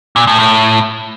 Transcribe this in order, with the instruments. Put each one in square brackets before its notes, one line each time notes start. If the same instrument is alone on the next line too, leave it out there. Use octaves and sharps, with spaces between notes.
[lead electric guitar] A#2
A2
A2